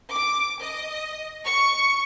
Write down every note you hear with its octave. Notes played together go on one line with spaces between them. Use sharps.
D6
D#5
C#6